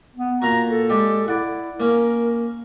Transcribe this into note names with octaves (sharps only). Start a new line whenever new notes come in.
B3
A#2 F#4 A#5
A4
G#3 D4 G4
E4 D5 F#5
A#3 C#4 A#4